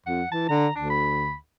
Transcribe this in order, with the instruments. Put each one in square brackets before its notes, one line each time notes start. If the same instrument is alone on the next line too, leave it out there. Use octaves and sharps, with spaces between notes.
[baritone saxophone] F2 [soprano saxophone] F#5
[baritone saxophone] E3 [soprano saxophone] A5
[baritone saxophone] D3 [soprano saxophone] A#5
[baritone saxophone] D2 [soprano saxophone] D4
[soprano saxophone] B5